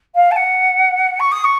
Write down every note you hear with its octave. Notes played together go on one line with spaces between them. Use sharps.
F5
A5
F#5
C#6
D#6
C#6